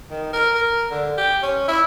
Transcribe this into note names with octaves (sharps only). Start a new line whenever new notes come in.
D#3
A#4
A#4
D3
G4
C#4
E4